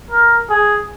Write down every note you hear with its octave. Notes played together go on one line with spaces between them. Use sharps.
A#4
G#4